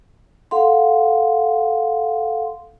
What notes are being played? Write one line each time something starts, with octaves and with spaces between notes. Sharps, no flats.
A4 F5 F#5 C6